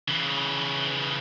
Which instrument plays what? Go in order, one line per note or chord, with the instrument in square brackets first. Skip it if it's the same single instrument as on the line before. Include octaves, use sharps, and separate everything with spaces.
[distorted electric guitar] C#3 E3